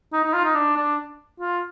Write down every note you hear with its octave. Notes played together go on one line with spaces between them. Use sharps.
D#4
D#4
F4
D#4
D4
D4
F4